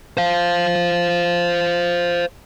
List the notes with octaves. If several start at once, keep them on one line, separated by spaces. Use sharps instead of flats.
C5 F5